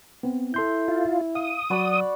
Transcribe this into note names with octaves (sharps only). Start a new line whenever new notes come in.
B3 C4
E4 A4 C6 G6
F4
F5 D#6
F#3 F#4 D5 B5